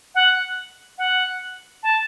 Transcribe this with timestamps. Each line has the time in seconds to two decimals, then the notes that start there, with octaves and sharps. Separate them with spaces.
0.15 F#5
0.98 F#5
1.83 A5